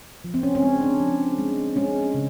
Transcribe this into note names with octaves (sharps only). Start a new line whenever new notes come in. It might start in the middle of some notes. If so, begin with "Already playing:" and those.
F3
C4
C#4
C#4
G#3 C4
D4
F3
G#3
G#3 C#4
C#3